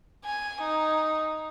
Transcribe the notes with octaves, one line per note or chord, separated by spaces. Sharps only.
G#5
D#4